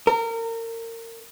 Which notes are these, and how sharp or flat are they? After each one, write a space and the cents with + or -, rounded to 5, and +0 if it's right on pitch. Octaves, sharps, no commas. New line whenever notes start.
A#4 -30